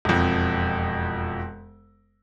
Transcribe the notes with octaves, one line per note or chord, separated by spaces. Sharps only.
E1 F2